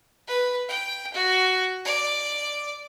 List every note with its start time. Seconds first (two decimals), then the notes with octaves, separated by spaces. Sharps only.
0.28 B4
0.69 G5
1.14 F#4
1.85 D5